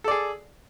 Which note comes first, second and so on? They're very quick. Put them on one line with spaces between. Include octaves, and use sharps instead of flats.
A4 D5 G#4